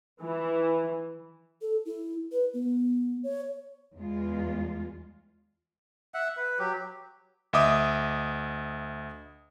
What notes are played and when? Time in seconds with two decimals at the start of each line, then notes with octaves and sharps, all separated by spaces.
0.23 E3
1.62 A4
1.86 E4
2.32 B4
2.54 B3
3.23 C#5
3.96 E2 G#3 F4
6.14 E5 F#5
6.37 B4
6.59 F#3 G4
7.53 D2 D#5 E5 D6 D#6